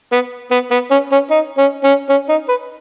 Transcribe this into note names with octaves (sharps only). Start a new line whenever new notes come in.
B3
B3
B3
C#4
C#4
D#4
C#4
C#4
C#4
D#4
B4